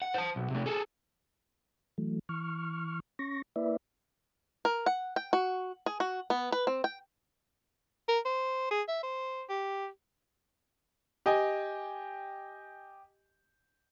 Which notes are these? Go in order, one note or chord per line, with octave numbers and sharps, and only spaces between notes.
F#5
C5 A5
B1
C3 A3
G#4 A4
E3 F#3 A3
E3 C#6 F6
C#4 C#6 A#6
A#3 E4 B4 D5 E5
A#4
F#5
G5
F#4
G#4
F#4
B3
B4
C4
G5
A#4
C5
G#4
E5
C5
G4
G4 D#5 G5 G#5